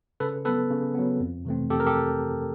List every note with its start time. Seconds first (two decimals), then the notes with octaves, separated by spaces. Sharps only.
0.20 C#3 A4 B4
0.45 B3 A4 B4
0.49 F#3
0.70 C#3
0.95 F#3 B3
1.20 F2
1.45 C3 E3 A3 C4
1.70 F2 G4 A4
1.80 A#4
1.86 G4 A4